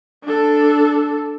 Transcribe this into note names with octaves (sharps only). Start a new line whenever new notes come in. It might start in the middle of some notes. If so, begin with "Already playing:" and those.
D4 A4